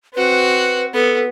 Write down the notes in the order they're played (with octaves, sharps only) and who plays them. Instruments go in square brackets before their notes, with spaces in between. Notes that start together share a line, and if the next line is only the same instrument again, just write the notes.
[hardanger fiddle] C4 F#4 [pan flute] B4
[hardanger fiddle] B3 [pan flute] A4